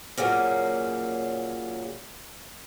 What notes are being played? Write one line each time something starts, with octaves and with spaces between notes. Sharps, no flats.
A#2 C#3 F#3 A#3